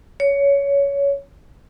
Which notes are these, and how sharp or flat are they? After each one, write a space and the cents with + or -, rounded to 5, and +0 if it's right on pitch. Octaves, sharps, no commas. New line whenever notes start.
C#5 +15